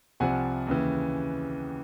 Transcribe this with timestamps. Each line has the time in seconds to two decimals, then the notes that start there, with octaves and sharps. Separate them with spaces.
0.20 C2 C3 F3 F#5 G#5
0.67 D#2 C#3 E3